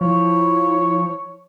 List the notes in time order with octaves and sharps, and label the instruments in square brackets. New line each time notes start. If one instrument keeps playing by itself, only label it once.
[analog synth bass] F3 [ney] E4 [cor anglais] C#5